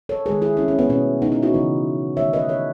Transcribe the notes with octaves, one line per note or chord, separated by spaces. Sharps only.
A4 C#5
D#3 G#3 B3 G#4 B4
E4 G#4
C#4 E4
C#4
B3
B2 A3 C#4
B3 D#4
C#4 E4
D#4 F#4
C#3 E3 B3
D#3 A3 C#5 E5
B4 D#5
A4 C#5